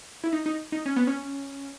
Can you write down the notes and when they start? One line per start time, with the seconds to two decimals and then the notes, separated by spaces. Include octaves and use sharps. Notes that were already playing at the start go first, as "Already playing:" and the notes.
0.24 E4
0.33 D#4
0.46 D#4
0.72 D#4
0.86 C#4
0.96 B3
1.07 C#4